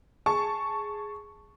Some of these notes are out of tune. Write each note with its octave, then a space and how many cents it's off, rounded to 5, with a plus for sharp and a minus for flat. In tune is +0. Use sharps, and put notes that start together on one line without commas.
G#4 +0 A5 +0 C#6 +0